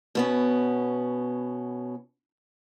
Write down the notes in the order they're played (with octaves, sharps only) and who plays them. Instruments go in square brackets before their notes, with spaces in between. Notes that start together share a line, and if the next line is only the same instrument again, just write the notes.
[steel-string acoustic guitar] B2 B3 C#4